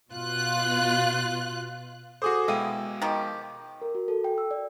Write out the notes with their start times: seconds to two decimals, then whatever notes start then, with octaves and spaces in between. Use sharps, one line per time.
0.13 B2 F4 F#6
2.22 F#4 G#4 A4 C5 D6 D#6
2.48 B2 G#3 E4 F5 G5 D#7
3.02 D#3 F3 G4
3.82 A#4
3.95 F#4
4.08 A4
4.24 G5
4.38 E6
4.51 D5